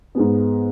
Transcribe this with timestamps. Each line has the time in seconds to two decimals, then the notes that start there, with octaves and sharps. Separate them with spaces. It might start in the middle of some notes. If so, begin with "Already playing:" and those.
0.15 G#2 G#3 B3